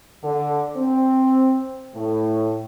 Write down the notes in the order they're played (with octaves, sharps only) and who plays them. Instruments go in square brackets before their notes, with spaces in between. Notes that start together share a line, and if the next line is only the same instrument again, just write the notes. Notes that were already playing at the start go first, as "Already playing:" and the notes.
[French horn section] D3
C4
A2